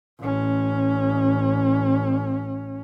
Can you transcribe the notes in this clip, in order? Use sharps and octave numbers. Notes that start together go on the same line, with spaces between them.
A1 C#4